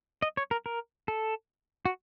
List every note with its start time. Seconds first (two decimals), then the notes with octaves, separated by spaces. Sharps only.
0.22 D#5
0.37 C#5
0.51 A#4
0.66 A#4
1.08 A4
1.85 F#4